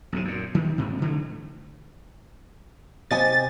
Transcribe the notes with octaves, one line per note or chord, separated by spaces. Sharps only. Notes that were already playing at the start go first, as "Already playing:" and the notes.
B1 G2 C3
F#2 A#2
D#3 F3 G3
D2 G#2 C3
D3 E3 A3
C3 D#5 G#5 A6